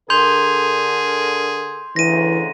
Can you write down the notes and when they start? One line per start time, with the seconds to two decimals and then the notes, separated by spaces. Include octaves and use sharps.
0.10 D3 G#4 A#4 C6 G6 F7
1.96 D2 C#3 E3 A#6 D#7